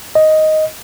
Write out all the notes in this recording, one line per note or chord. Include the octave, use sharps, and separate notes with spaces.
D#5